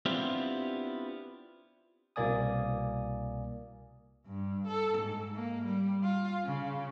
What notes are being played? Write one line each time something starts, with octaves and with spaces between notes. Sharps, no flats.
B3 C4 D4 E4 F4 G4
C2 B2 A#3 D5 G#5 D#6
G2
A4
G#2
A#3
G3
F4
C#3